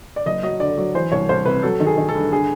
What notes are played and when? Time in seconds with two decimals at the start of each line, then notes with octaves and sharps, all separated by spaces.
0.16 D5
0.26 F#1 D#5
0.43 F#3 D#5
0.60 D3 D5
0.77 F#3
0.94 E3 C5
1.12 C2 C#5
1.29 C2 C5
1.46 C3 B4
1.63 F#3 A4
1.80 D#3 A4
1.86 G#4
1.98 D#3
2.09 A4
2.15 G2
2.32 D3 G#4